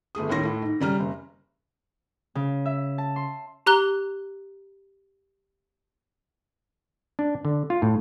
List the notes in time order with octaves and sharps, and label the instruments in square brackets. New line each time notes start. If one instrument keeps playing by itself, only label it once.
[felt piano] G1 A3 G#4 D#6
D#2 A2 C#4 C6 A#6
A2 A3
G#2
C#3 G3 A#5 F6
F#1
[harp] C#3
E5
A5
C6
[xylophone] G4 A#5 F#6 G7
[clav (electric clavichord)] D4
D3
F4
A2